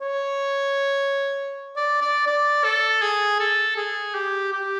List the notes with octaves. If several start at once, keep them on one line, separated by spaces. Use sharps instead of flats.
C#5
D5
D5
D5
A4
G#4
A4
G#4
G4
G4